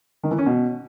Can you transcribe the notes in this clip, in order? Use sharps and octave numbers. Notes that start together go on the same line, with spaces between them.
D#3
E3
C#4
B2